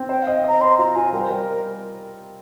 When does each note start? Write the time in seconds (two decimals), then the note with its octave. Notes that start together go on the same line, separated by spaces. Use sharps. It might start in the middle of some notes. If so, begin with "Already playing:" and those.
Already playing: C4
0.09 C5 G5
0.22 D#5 F5
0.44 D#5 A#5
0.61 C5 C6
0.78 F4 A#5
0.95 F4 G#5
1.13 G3 A#4
1.21 C5
1.30 G3 A#4